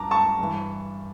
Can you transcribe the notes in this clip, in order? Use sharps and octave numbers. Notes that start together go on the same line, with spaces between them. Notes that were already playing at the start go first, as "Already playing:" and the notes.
Already playing: G2 A5 A#5 D6
A5 C#6
G2 E3